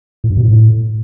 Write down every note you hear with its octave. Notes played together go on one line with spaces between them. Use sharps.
A2
G2
B2
A2